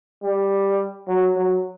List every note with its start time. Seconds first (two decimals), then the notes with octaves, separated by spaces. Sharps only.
0.23 G3
1.08 F#3
1.37 F#3